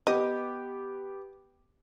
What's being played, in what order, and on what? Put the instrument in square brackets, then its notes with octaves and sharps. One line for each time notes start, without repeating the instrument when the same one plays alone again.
[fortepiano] B3 G4 [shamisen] D#5